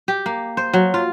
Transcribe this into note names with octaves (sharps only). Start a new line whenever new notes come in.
G4
A#3
C5
F#3
F4